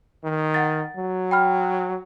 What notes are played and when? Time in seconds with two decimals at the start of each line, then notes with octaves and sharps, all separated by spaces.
0.24 D#3
0.54 F#5 A6
0.97 F#3
1.31 G5 B5 F6